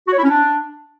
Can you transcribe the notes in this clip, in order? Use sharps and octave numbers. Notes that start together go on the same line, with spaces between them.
F#4
C#5
E4
C#4
D4